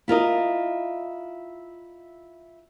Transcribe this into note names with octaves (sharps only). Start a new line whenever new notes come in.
E4 F4 A#4 D#5